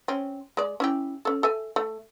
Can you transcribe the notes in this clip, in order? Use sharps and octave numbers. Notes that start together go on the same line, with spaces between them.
C4 C#4
G#3 D5
C#4 E4 G4
C#4 A4
A4 E5 G#5
A3